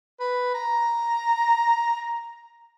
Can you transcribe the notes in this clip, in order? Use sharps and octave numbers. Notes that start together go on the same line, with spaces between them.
B4
A#5